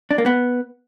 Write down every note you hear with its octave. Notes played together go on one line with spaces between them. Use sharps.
D4
A#3
B3